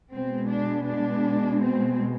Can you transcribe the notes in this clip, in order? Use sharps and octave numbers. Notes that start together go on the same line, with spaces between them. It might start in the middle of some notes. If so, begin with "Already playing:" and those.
B2 G#3 B3 C4
D4
D4
C4